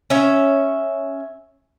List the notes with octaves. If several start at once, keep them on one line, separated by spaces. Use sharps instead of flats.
C#4 E5